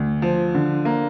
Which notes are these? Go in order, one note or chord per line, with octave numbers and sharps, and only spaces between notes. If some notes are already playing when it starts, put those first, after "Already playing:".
Already playing: D2
F3
D3
A#3